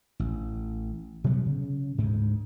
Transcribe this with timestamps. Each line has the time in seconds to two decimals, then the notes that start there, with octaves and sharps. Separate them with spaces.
0.20 A1
1.24 B2 F#3 G3 B3
1.46 C#3
1.98 D2 G#2